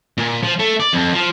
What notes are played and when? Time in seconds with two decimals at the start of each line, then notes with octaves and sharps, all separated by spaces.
0.17 A#2
0.43 F3
0.59 A3
0.80 D5
0.93 F2
1.13 F3